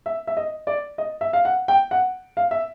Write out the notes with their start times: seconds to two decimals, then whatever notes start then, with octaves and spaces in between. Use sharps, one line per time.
0.06 E5
0.27 E5
0.37 D#5
0.67 D5
0.98 D#5
1.21 E5
1.33 F5
1.45 F#5
1.68 G5
1.91 F#5
2.37 F5
2.51 E5